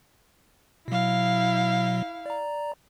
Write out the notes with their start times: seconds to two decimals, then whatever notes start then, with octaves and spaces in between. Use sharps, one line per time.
0.88 B2 F#3 E4 F5
2.26 D5 A#5